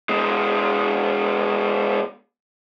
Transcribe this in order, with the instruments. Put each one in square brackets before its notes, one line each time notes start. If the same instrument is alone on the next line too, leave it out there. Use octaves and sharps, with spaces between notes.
[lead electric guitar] B2 G#3